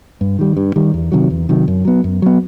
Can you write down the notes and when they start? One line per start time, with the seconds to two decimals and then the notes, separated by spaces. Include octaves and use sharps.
0.21 G2
0.39 D#3 G3
0.57 G2
0.76 D#3 G3
0.94 E2
1.12 C3 D#3 F#3
1.30 E2
1.49 C3 D#3 F#3
1.68 F#2
1.85 F#3 B3
2.04 F#2
2.22 F#3 B3